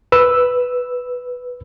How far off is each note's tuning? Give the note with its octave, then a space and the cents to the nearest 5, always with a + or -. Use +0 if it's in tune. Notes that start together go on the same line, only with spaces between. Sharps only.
B4 +0 E6 +0